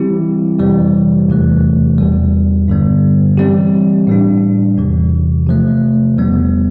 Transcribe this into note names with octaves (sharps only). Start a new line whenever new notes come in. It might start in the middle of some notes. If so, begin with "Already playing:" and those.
Already playing: E3 G3 C4 E4 G4
F2 C3 E3 G3
E2 C3 E3 A3
E2 B2 G3
G2 D3 G3 B3
E3 G3 C4 G4
A2 G3 D4
E2 C3 E3
C3 F3 A3
E2 B2 G3 B3